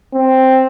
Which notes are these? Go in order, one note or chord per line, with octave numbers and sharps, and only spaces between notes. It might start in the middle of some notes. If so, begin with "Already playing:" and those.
C4